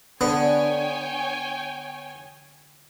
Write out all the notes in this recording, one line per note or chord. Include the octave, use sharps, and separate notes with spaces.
D3 B3 C#5 G5 G#5